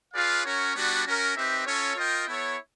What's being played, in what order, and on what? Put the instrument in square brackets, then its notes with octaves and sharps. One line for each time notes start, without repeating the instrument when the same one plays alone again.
[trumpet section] F4 G#4 B4 D5 F5
C#4 F#4 A#4 C#5
G3 B3 D4 F#4
C#4 F#4 A#4
C4 D#4 G4 B4 E5
C#4 F4 A4 C#5
F4 A#4 D#5 G5
B3 E4 A4 C#5